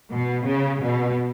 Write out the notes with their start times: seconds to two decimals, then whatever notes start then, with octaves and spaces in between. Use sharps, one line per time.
0.11 B2
0.45 C#3
0.81 B2